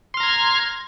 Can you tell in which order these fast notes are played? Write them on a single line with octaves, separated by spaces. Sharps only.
C6 F6 A#5 G#6